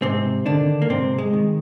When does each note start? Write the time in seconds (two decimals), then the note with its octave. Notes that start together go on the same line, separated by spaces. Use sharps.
0.02 G#2 C3 C4
0.45 D3 D#3 D4
0.82 A#3
0.89 G#2 C3 C4
1.18 G#3
1.33 D#3